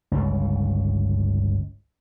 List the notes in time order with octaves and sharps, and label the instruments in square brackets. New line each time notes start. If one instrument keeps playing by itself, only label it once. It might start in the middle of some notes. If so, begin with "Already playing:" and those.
[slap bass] G1 C#2